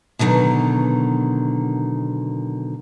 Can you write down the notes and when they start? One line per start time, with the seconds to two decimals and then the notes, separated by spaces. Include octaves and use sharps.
0.19 B2 D3 D#3 F#3